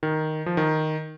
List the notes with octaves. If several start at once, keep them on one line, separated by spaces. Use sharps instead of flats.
D#3
F3
D#3